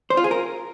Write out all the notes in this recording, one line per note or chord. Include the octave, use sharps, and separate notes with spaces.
C5
F4
G#4
A#4